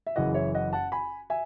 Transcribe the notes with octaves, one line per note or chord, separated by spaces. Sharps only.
E5
F#1 F#2 C#3 E3 D#5 F#5
C#5 E5
D#5 F#5
F#5 A5
G#5 B5
E5 G#5